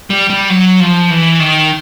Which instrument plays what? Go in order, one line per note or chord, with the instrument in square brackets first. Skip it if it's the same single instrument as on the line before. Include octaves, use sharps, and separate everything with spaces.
[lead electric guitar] G3
G3
F#3
F3
E3
D#3